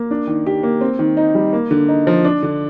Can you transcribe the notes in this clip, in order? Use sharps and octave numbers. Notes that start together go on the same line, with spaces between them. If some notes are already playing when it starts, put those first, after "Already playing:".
Already playing: A#3
D4
D#3
G4
A#3
C4
D#3
D#4
G3
A#3
D3
D#4
F3
D4
D3